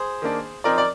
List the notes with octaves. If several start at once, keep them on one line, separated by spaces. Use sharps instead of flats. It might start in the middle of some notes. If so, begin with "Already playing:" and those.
Already playing: G#4 C5
D#3 A#3 D4
F3 C4 D#4 A#4 D5
D5